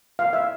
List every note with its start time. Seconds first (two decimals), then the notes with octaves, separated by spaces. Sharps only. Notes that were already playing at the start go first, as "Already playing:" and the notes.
0.19 F5
0.33 E5